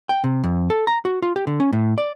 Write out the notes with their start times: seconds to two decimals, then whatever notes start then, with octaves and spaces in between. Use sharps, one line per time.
0.09 G5
0.24 C3
0.44 F2
0.70 A4
0.87 A#5
1.05 F#4
1.22 F4
1.36 G4
1.47 D3
1.60 C#4
1.73 A2
1.98 D5